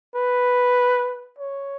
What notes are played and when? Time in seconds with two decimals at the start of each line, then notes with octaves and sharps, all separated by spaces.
0.15 B4
1.38 C#5